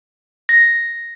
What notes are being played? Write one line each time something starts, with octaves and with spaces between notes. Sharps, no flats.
A#6